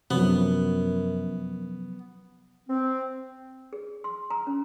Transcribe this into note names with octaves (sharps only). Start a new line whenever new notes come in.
F#2 C3 F3 F#3 B3
C4
G#4
C6
A#5
C#4